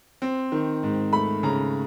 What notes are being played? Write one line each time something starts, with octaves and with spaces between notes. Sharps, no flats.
C4
D#3
G#2
A3 B5
C#3 A#5